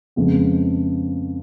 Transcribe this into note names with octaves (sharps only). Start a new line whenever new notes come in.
F2 C#3 G#3 B3